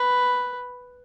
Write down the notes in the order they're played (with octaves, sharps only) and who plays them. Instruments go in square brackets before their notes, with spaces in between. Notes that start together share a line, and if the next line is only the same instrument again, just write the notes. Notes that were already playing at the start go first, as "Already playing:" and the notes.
Already playing: [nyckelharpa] B4